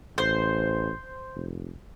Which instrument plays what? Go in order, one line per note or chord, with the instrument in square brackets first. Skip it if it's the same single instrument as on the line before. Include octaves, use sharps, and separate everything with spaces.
[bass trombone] A1 [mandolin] C5
[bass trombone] F1